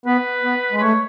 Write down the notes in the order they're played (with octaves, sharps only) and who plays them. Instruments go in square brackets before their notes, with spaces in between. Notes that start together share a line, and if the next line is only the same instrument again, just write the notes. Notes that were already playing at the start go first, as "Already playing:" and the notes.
[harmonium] B3 [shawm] B4
[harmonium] B3
G#3
[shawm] B4
[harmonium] A3 [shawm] C#5